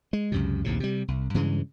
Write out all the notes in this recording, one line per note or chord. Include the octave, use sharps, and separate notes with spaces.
G#3
C#2 F#2 C3
A#1 D#2 A2 C3
C3 G3
C2
G2 C#3 E3 G#3